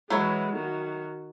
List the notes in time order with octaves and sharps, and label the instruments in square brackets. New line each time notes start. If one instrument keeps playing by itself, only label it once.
[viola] E3 G#3 [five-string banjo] F#3 E4 C#5
[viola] D#3 F#4